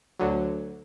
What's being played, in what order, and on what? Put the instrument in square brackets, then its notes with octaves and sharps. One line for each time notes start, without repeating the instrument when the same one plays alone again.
[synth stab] D2 D3 F#3